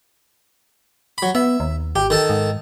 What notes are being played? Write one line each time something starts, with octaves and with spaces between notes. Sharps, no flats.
F#3 B5
B3 E5
D#2
G#1 G4
D#3 A4 A5
G#2